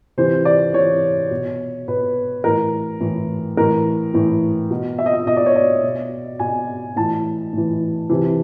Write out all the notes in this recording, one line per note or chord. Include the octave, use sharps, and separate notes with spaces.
C3 E3 C5
D5
C3 E3 C#5
B2
B2 B4
A2 E3 A#4
A2 E3
A2 E3 A#4
A2 E3
B2
E5
D#5
E5
B2 D#5
D5
C#5
D5
B2
B2 G#5
A2 E3 A5
A2 E3
C3 E3